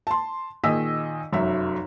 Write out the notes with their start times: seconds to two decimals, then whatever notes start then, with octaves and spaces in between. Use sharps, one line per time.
0.07 A5 C6
0.64 A#2 D#3 G#4 D#5 E6 B6
1.32 F1 F#2 F#3 E5